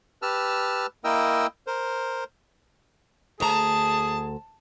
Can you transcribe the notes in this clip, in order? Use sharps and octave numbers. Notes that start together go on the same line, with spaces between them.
G4 B4 A5 E6 F6
A#3 E4 A#4 D#5 G5 E6
A#4 C5
D2 G#4 A5 A#5